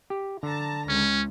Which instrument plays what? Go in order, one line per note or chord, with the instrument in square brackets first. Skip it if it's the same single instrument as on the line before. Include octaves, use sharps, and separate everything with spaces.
[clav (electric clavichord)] G4
[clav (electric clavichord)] D3 [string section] A5 A#5
[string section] C#2 [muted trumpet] C#4